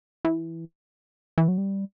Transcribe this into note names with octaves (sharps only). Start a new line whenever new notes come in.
E3
E3
F#3
G3